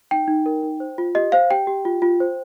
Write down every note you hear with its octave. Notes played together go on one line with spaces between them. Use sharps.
D#4 G5
D#4
A#4
D#4
C5
F4
G4 D#5
C5 F5
G4 G5
G4
F4
F4
C5